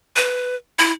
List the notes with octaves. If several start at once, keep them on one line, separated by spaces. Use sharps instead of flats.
B4
E4